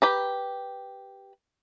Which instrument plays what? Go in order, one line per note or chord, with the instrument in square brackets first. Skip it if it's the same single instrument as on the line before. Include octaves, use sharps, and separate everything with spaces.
[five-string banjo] G4 B4 A#5